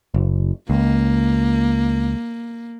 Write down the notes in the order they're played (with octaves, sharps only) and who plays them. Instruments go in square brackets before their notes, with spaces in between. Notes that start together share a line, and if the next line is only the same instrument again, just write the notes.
[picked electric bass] F#1
[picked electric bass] C#2 [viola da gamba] A#3